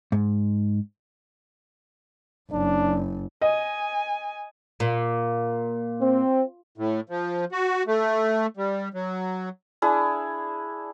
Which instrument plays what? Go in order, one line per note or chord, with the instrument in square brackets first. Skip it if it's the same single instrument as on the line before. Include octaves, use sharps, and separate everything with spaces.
[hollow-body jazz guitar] G#2
[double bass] F#1 [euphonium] D4
[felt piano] D#5 [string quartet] G#5
[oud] A#2
[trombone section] C4
[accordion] A2
F3
F#4
A3
G3
F#3
[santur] D4 E4 G#4